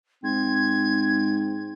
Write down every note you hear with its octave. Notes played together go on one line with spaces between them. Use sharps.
G#2 C4 G#6